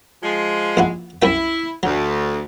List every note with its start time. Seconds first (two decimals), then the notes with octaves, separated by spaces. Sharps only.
0.23 F3 G#3
0.77 A#1 E4 F#4
1.22 C2 F#2 E4 G5
1.83 D2 F#3